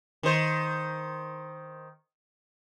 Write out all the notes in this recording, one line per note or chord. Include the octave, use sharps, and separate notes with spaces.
D#3 C5